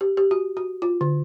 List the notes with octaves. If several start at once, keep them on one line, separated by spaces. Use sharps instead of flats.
G4
G4
F#4
F#4
F4
D3